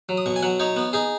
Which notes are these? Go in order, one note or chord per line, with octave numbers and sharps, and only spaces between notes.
F#3
D#6
B2 C#6
G#5
F#3 F#5
D#4 C#5
B3
D#4 G#4